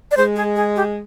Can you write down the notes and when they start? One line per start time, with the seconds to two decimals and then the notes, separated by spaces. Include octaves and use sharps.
0.11 D5
0.17 G#3 C5
0.36 G#4
0.56 G#4
0.76 G4